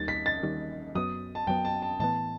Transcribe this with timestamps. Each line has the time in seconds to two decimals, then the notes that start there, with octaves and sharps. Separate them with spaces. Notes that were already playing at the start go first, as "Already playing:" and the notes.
Already playing: D#2 D#3 G3 A6
0.08 B6
0.26 A6
0.43 D#2 D#3 G3
0.95 F#2 F#3 B3 D#6
1.35 A5
1.47 F#2 F#3 B3 G5
1.65 A5
1.82 A5
2.00 A2 E3 B3 A5